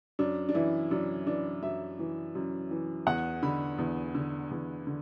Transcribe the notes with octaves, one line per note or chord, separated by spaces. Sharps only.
F#2 D4
D4
E3 E4
F#2 D4
E3 D4
F#2 E5
E3
F#2
E3
E2 F#5
D3 B5
E2
D3
E2
D3